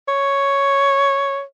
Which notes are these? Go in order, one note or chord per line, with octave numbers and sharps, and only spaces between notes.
C#5